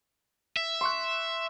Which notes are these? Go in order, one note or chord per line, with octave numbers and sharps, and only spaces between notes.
E5
C6 C#6 F#6